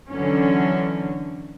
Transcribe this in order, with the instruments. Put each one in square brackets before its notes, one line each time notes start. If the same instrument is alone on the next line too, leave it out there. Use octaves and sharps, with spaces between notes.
[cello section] D3 E3 F#3 C#4